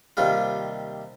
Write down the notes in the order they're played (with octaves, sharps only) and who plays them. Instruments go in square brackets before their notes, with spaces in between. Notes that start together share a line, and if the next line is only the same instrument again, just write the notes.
[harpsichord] D#2 C3 G3 F4